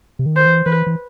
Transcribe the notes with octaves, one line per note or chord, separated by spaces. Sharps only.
C3
D#3
C5
E3
E3 B4
E3